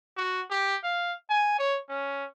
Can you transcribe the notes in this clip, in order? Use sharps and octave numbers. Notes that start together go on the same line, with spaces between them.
F#4
G4
F5
G#5
C#5
C#4